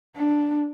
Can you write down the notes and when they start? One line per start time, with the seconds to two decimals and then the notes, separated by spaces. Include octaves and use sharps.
0.16 D4